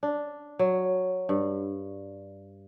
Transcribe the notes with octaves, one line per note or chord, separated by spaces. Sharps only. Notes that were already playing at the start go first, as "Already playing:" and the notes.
D4
F#3
G2